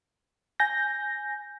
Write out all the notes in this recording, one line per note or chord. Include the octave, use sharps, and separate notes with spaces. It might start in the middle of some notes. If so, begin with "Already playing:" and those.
G#5 G6 A#6